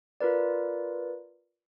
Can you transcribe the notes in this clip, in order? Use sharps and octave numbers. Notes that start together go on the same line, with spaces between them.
F4 A#4 B4 D5